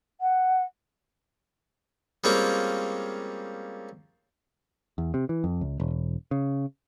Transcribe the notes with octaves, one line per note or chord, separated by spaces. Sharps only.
F#5
G3 G#3 A#3 C4 C#4 F4
E2
C3
E3
F2
C#2
E1
C#3